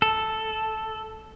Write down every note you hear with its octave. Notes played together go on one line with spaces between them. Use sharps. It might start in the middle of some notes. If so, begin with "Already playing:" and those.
A4